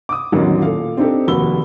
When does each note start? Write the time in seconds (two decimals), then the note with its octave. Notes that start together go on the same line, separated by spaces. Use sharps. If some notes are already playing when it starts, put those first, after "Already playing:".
0.09 D6 D#6
0.32 A1 E2 D3 D#3 F#3
0.62 A#2 A4 F5
0.97 C4 D4 D#4 G4 A4
1.27 F1 D#2 F#4 B5 E6 G7